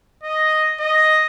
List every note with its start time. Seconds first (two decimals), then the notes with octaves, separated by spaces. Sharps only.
0.23 D#5
0.80 D#5